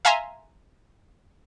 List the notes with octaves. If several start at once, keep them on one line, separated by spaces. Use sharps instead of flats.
E5 F5 G#5 A#5 C6